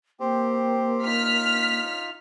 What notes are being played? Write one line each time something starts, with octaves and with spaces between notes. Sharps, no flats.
A#3 C4 G4 C5
D#4 F4 F6 B6